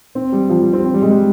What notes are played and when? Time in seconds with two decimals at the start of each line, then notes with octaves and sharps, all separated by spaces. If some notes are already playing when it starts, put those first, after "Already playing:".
0.15 C4
0.32 G3
0.49 F3
0.61 G3
0.73 C4
0.85 C4
0.94 G3
1.02 G#3
1.11 G3